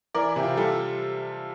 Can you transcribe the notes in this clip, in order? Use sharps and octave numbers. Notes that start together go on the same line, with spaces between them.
E3 A#4 D5
E4
C3 G4
F4
G3 F4 A4